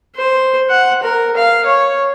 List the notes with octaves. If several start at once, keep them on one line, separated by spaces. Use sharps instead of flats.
C5
F#5
A#4
F5
C#5